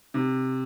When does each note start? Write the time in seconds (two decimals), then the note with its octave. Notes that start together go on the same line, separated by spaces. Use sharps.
0.14 C3